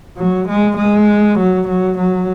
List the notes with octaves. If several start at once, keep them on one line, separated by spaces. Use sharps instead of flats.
F#3
G#3
G#3
F#3
F#3
F#3